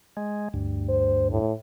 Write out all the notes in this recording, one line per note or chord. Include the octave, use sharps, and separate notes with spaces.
G#3
D2 G2
C5
A2